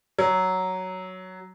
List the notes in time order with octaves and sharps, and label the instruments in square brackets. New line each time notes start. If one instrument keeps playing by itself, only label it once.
[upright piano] F#3